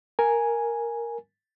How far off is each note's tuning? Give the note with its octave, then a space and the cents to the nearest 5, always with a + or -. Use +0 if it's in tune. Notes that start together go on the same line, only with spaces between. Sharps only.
A#4 +0 G#5 +0